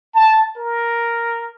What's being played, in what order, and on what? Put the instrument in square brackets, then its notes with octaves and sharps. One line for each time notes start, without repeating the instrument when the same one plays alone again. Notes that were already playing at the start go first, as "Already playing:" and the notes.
[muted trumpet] A5
A#4